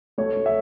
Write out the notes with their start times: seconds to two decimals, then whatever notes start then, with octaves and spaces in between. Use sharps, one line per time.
0.18 A3 C#5
0.36 A3
0.46 E5